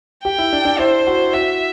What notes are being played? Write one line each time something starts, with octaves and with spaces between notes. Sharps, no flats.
G4 G5
E4
D4
D4
E4 C5
F#4
F#4 E5